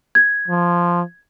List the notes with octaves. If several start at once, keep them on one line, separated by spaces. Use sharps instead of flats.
G#6
F3